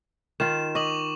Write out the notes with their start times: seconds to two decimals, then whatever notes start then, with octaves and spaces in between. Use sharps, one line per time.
0.40 D#3 F4 E7
0.75 D#5 C#6 D6 F#7